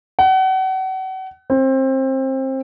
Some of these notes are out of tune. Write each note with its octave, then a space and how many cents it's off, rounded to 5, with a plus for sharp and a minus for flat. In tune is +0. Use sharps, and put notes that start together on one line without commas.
F#5 +35
C4 +25